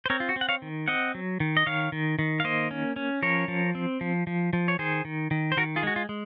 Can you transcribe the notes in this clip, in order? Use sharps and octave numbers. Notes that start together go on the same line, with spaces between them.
C5
C4 A#4 C#5
F4
F#4
C4
F#5
C#5 F5
D#3
C4 D#5 F#5
F#3
D#3
D#5
D#3 C#5 F5
D#3
D#3
F5
A#3 C5 D#5
C#4
C#4
F3 A#4 C#5
F3
C4
F3
F3
F3
C#5
D#3 G#4 C5
D#3
D#3
C5
D#3 F#4 A#4
F4 G#4
G#3 F#4
F4
G#3